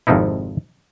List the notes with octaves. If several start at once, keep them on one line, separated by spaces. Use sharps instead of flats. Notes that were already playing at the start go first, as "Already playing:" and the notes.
G#1 F2 C3 F3 D#4 E4